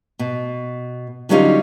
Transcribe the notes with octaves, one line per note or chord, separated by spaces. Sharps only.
B2
D3 F#3 G3 C#4 D#4 F4